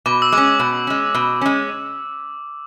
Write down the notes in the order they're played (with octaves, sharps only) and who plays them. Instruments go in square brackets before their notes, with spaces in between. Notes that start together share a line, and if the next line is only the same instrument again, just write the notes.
[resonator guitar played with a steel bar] B2 [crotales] D6
[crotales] E6
[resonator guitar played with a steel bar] G#3 C#4 [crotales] D6
[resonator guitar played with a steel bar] B2
G#3 C#4
B2
G#3 C#4